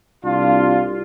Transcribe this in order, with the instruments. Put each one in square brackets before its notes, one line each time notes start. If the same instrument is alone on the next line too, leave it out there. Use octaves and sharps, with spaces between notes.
[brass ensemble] C2 D4 F4